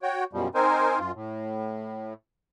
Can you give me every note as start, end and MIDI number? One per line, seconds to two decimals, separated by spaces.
0.02 0.24 66
0.02 0.24 73
0.02 0.24 79
0.33 0.48 42
0.33 0.48 47
0.33 0.48 53
0.33 0.48 55
0.55 0.99 60
0.55 0.99 63
0.55 0.99 70
0.55 0.99 72
0.55 0.99 80
0.99 1.12 42
0.99 1.12 65
1.15 2.13 45